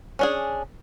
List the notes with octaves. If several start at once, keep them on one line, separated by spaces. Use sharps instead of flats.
C#4 D4 G#4